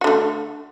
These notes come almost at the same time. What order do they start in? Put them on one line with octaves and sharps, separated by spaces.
F#4 D3 A3